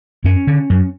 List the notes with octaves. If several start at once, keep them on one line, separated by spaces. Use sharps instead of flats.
F#2 C#4
D3
F#2